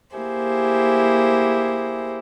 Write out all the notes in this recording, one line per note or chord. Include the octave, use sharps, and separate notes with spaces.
A#3 E4 G4 G#4 C5